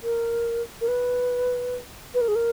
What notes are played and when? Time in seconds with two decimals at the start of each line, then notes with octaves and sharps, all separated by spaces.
0.03 A#4
0.81 A#4
0.88 B4
2.14 B4
2.21 A#4
2.28 G#4
2.36 A#4